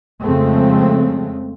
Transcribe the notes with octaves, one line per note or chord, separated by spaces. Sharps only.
F2 C#3 F3 G#3 A3 C4